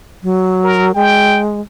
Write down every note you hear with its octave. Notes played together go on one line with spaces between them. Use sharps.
F#3
A#4
G#3 G5